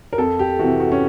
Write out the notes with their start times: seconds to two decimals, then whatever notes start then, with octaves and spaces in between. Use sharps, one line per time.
0.13 A#4
0.18 F2 A4
0.39 G4
0.59 C3 E3 F#4
0.80 F#4
0.92 C#4